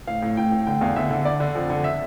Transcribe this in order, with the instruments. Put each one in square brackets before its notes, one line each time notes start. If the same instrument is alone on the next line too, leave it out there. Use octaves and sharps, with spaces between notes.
[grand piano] A2 F5
A2
A2 G5
A2
D3 G5
E2 F5
D3 E5
D3
D3 D5
D3
F2
D3
E5